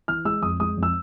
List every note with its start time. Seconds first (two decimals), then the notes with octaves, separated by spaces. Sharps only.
0.08 E3 F6
0.25 G#3 E6
0.42 F2 D#6
0.60 G#3 D#6
0.77 F2
0.83 E6